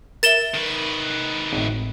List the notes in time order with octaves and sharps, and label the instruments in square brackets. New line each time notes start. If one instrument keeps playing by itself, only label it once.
[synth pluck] A#4 E5 [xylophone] A6 E7 G7
[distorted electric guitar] D#3 B4
[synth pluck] G#1 A2